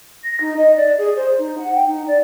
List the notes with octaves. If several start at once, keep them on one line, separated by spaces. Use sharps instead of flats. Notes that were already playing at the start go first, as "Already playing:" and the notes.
A#6
D#4
D#5
D5
G#4
C5
D#4
F#5
G5
D#4
D5